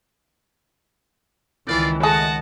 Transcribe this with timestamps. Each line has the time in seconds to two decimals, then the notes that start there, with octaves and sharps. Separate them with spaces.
1.68 C#2 D#3 E3 G#3 F4 D5
2.03 A3 G#4 D#5 F#5 A5